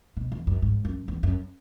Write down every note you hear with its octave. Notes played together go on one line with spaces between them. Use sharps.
B2
E2
F#2
G#2
F#2
E2
F#2